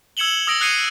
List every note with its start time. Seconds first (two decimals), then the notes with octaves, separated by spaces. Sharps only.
0.17 E6 G#6 C#7 E7 F#7 G7
0.47 D#6 E6 A#6 D7
0.61 D#6 F#6 G#6 C7 C#7 D#7